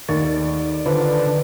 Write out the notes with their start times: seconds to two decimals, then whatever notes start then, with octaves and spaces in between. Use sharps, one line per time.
0.09 D#2 D#3 A3 D5 C#6
0.86 D3 F4 B4 C5